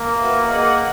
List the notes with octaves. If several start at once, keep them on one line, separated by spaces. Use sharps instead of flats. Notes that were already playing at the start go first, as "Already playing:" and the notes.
Already playing: A#3
F#4 B4 E5
A#3 G#4 D#5 F#5